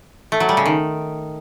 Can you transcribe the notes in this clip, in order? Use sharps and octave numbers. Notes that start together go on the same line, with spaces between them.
A3
F#3
G3
C#3
D#3